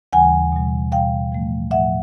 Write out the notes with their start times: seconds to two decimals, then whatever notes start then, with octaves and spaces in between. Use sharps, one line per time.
0.13 D#2 C#3 E3 G3 F#5 G#5
0.52 B2 G3
0.92 B2 G3 F5 G5
1.32 A2 F3 A3
1.71 A2 F3 A3 E5 F#5